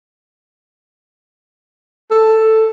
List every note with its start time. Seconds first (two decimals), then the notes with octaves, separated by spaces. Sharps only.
2.11 A4